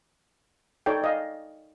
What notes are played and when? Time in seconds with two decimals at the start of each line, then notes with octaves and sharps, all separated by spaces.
0.86 D#4 A4 C#5 D5 G5
1.02 D5 D#5 F5